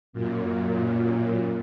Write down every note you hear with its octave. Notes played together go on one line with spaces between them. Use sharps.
F#2 A#2